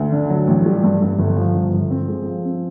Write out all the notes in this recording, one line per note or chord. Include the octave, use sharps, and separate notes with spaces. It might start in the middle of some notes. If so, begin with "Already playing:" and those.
Already playing: D2
D3
F#3
A1
G3
G2
G2
G1
F3
G1
G1
C4
G#3
F3
C4